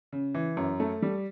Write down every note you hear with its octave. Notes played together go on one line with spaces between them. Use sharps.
C#3
E3
F#2
A3
G3